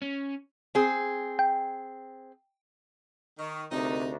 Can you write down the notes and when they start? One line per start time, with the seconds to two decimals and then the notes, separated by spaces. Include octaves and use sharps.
0.02 C#4
0.75 C4 G#4
1.39 G5
3.39 D#3 C#6
3.72 D2 C3 D#4 A#4 D#5